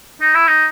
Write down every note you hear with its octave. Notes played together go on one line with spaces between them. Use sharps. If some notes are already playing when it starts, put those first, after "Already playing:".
D#4
E4
D#4